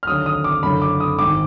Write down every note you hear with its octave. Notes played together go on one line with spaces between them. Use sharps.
F6
D#2 D3 F#3 D#6
D#6
D6
F#1 F#2 D3 F#3 B5
D6
D#6
G#1 G#2 D#3 D6